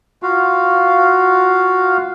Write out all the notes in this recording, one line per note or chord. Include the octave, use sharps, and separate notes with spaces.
F4 F#4 F5